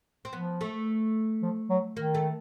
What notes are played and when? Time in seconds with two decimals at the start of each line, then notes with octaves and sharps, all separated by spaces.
0.25 C4
0.33 F3 B3
0.61 A3
1.42 F3
1.70 F#3
1.96 D#3 A#3
2.14 A3